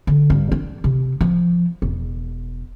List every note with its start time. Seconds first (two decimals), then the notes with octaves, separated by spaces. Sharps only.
0.07 D3
0.30 G2
0.52 D4
0.84 C3
1.21 F3
1.82 E1